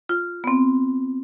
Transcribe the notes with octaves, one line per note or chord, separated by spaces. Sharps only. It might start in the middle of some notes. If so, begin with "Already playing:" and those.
F4
B3 C4